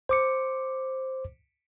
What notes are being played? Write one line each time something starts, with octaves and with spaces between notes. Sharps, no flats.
C5 D6 C#7